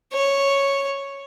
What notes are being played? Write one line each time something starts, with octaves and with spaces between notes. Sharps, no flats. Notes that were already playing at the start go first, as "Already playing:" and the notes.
C#5